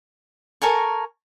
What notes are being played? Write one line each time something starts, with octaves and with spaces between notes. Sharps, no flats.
A4 A#4 G#5 C#6